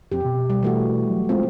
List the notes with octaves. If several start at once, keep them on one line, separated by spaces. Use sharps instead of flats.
F2 C4 G4
B2
G3
E3 A3 F#4
F#3
G#3 C4 F4